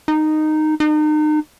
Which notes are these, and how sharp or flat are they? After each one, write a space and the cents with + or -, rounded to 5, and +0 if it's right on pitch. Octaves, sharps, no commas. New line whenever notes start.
D#4 -10
D#4 -35